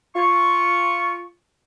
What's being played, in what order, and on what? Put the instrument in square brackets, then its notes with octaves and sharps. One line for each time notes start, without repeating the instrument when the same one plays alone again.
[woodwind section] F4 C#6